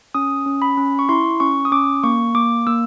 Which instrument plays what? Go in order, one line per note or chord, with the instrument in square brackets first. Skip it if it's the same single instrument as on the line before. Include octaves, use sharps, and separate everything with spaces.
[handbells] C#4 D#6
C#4
B5
C#4
C#6
E4 C6
C#4 C#6
D#6
C#4 D6
A#3 C#6
A#3 D6
A#3 E6